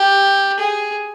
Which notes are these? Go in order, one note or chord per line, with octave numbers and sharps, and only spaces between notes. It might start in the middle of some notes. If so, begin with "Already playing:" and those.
Already playing: G4
G#4